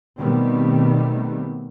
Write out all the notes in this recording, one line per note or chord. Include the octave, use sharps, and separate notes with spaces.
B2 D#3 G3 A3 B3 C4